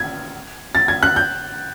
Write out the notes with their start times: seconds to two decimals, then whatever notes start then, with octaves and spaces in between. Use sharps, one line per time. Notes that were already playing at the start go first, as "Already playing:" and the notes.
Already playing: G#6
0.75 A6
0.88 G#6
1.03 F#6
1.16 G6